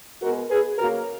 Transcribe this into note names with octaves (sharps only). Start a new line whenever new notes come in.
B2 G#3 B3 F#4 A#4
G#4 B4
C#3 F#3 A#3 F#4 A#4